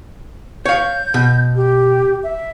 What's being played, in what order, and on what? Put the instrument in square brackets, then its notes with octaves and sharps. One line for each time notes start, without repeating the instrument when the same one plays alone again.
[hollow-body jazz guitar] C#5 F5 [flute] G6
[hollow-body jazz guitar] B2
[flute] G4
E5